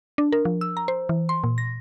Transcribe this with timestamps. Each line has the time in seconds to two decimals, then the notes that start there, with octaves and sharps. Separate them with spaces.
0.18 D4
0.32 A#4
0.45 F3
0.61 E6
0.77 A#5
0.88 C5
1.09 E3
1.29 C6
1.44 A#2
1.58 A#6